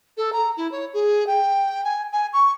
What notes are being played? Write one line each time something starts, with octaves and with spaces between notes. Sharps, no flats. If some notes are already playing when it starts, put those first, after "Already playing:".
A4
A#5
E4
C#5
G#4
G5
G#5
G#5
C#6